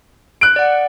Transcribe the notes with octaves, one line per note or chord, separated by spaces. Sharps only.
F#6 D7
D5 F#5